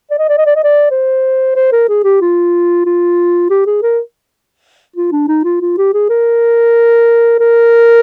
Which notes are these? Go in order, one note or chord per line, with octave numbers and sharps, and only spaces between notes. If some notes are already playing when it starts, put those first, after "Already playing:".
D5
D#5
D5
D#5
D5
D#5
D5
C5
C5
A#4
G#4
G4
F4
F4
G4
G#4
A#4
F4
D4
D#4
F4
F4
G4
G#4
A#4
A#4